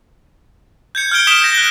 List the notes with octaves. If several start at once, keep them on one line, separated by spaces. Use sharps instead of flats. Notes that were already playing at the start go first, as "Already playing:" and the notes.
G6 G#6 C#7
F6 G6 G#6 D7 G7
D#6 B6 D7 E7 G7
G6 A#6
F#6 G7